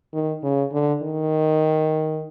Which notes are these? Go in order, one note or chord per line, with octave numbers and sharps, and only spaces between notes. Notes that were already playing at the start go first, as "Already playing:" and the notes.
D#3
C#3
D3
D#3